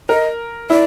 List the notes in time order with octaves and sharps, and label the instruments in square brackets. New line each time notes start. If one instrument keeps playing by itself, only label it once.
[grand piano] A#4 [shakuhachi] D#5
[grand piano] E4 [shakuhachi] D5